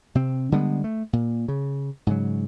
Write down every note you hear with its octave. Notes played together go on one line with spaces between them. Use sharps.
C3 C4
D3 G3 G#3 B3
A3
A#2
C#3
G#2 C#3 F#3